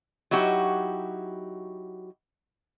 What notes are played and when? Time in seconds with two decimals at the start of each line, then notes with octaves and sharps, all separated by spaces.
0.31 F#3 D#4 E4 F#4 G4